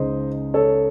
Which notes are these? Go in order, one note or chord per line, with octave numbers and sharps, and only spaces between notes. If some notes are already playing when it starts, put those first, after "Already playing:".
Already playing: C#2 C#3 G#3 D#4 C5 D#5
A4 C#5